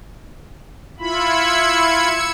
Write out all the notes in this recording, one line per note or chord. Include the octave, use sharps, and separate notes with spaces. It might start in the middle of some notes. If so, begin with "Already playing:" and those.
E4 F4 B5 E6 G#6 C#7